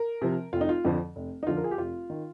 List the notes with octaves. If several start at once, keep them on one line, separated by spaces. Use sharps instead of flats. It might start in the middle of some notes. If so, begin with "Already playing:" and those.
Already playing: A#4
C3 F3
F1 F4
D#4
F4
F2 D3 F3
F1
D#4
F2 D3 F3 F4
A#4
G#4
G4
F1 F4
D#3